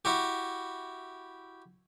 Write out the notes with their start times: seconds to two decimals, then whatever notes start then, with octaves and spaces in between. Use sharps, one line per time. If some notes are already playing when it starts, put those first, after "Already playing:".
0.05 E4 F#4 G4